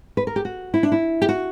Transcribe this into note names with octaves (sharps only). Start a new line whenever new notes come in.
B4
A#4
G4
F#4
E4
D4
E4
G4
F#4